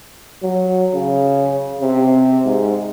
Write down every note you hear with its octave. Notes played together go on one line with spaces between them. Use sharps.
F#3
C#3
C3
G#2